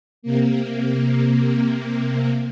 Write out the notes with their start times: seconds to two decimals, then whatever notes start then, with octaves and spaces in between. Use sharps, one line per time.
0.22 C3 A#3